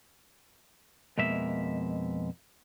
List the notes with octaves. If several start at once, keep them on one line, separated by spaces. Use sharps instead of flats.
F2 B2 G#3 A#3 E5